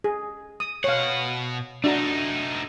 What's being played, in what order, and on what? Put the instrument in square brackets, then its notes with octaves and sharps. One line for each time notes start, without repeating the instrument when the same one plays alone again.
[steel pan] G#4
D#6
[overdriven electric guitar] B2 F#5 [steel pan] C#5 F5
[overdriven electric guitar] A3 D#4 [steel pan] D4 F#4 A#5